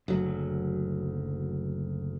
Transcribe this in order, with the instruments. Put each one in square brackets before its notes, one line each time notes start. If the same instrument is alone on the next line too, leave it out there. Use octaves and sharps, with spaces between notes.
[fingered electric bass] F#1 D2 F#3